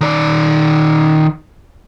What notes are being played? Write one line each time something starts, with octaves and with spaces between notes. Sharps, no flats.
D#3 D5